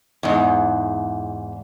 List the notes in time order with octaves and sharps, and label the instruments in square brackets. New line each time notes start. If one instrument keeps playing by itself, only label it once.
[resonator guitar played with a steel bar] E2 G#2